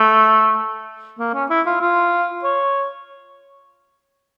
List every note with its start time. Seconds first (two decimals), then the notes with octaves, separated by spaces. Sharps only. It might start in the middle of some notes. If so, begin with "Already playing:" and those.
Already playing: A3
1.19 A#3
1.34 C#4
1.50 E4
1.66 F4
1.81 F4
2.44 C#5